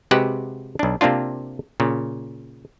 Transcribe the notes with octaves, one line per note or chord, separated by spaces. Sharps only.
C3 G#3 F#4 G4 B4 F#5
B1 D4
C3 A#3 C4 D4 F4
A#2 C#3